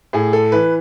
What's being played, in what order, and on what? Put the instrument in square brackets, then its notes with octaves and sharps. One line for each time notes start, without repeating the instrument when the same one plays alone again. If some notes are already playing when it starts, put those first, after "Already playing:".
[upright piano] A2 G#4
A4
E3 B4